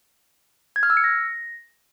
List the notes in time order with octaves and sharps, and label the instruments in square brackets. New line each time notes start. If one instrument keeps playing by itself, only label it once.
[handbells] G#6
F6
E6
C#7
A#6